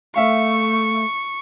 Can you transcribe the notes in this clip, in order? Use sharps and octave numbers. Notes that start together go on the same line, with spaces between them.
A3 E5 F5 C#6